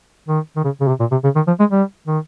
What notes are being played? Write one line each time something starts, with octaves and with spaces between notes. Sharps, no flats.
D#3
D#3
C#3
C#3
C3
A#2
C3
C#3
D#3
F3
G#3
G3
D#3